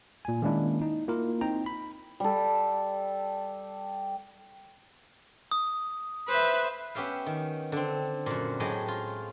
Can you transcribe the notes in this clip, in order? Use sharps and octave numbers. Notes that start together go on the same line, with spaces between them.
A#2 G#5
D#3 G#3 A#3 C#4 D4 E4
D#4
A#3 E4 F4 A#4
C4 D#4 G5 A#5
B5
G3 A4
D#6
B4 C5 E5
B3 C#4 G4 E5 F5
D#3
D3 C4
F#2 A#2
A2 F#3 G#3 G4 D#5
F4